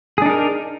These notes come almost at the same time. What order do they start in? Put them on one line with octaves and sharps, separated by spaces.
G#4 D4 D#4 A#4